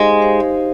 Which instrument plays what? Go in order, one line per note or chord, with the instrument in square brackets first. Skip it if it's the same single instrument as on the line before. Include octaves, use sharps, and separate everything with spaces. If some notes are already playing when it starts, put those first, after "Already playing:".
Already playing: [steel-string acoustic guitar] G#3 [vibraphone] D#4 G4 C5 F5
[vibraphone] D#4 G4 C5 F5